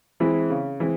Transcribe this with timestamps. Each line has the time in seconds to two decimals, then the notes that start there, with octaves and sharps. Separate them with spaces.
0.20 E3 G#3 C4 E4
0.50 C#3
0.80 E3 G#3 C4